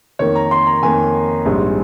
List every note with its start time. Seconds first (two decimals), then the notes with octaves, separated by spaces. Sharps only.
0.19 F2 D#3 A#3 C#5
0.36 A#5
0.51 C6
0.67 A#5
0.83 F2 D#3 A#3 G#5
1.45 A#1 G#2 G3 C4